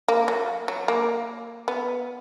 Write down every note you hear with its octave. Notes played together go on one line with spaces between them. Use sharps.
A#3
F#3
F#3
A#3
B3